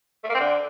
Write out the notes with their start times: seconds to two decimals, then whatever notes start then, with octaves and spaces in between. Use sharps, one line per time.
0.24 A3
0.29 A#3
0.34 C4
0.40 D3